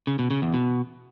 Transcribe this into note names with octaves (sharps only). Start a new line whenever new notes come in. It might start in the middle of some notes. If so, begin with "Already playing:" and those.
C#3
B2
C#3
E2
B2